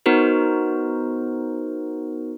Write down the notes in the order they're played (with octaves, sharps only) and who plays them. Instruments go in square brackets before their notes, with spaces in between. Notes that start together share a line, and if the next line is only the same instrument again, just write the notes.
[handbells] B3 D#4 F#4 A#4 C5